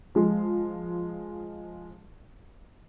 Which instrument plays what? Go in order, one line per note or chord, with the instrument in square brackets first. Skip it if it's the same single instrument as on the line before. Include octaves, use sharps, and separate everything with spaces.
[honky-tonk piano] F3 G#3